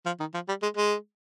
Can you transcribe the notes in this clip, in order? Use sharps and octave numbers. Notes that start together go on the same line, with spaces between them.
F3
D#3
F3
G3
G#3
G#3